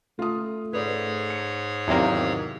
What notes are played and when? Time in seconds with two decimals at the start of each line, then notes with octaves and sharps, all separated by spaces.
0.19 A3 F4 D#6
0.73 G#2 G#4 B4 C#5 D5
1.30 C#7
1.88 E2 C3 D#3 F#3 A#3